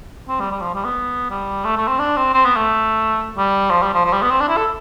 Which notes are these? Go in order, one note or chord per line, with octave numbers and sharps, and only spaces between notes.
C4
G3
G3
F3
G3
B3
G3
A3
A3
C4
D4
C4
C4
B3
A3
G3
F3
G3
F3
F3
G3
B3
C4
D4
E4
A4